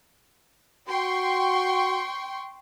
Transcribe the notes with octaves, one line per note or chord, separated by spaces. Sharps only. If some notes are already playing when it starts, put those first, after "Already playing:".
F#4 G5 C6 C#6